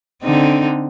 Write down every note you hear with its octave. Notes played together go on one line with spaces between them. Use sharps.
D3 C4 D#4